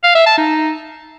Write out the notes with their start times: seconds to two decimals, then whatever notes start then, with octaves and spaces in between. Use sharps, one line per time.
0.04 F5
0.15 E5
0.26 A5
0.38 D#4